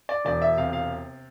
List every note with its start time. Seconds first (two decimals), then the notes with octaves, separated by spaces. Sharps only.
0.09 D5
0.25 E1 D5
0.42 E5
0.57 C3 F5
0.73 F5